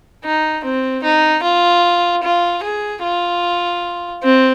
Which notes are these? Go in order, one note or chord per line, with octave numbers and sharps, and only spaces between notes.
D#4
C4
D#4
F4
F4
G#4
F4
C4